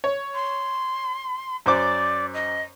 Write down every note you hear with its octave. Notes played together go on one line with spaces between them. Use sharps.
C#5
C6
F#2 C5 D5 D6
D#5